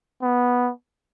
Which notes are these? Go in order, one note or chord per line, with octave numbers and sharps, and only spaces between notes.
B3